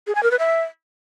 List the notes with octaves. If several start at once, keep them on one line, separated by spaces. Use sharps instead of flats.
G#4
G#5
A#4
B4
E5